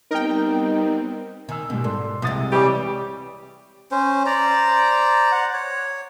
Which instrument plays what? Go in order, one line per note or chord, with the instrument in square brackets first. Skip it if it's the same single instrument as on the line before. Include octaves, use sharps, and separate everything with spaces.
[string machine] G3 B3 C4 [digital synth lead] D#4 [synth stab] A#4 G5
[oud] D#3 [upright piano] G#5 E6
[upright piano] G#2 G3 [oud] B2
[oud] G#2 [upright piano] A4 D5 C6
[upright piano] C2 D#6 A6 [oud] C3 G#3
[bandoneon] E3 G3 [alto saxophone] G4 [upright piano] C#5 D5 C#6
[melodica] C#4 C5
C5 D5 A#5
F#5
C#5